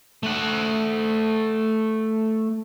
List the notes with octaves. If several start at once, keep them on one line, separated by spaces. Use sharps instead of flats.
A3 F#5